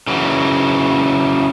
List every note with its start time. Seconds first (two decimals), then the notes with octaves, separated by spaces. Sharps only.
0.07 C#3 E3 F#3